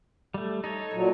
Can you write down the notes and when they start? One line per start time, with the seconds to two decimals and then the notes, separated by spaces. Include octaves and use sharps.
0.34 G3 A3
0.64 D#4 A4 C#5
0.93 A#2 F#3